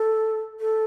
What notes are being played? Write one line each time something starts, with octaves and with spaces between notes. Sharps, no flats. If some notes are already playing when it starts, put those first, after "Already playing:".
Already playing: A4
A4